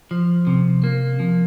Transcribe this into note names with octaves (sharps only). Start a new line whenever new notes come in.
F3
C3
A#3
F3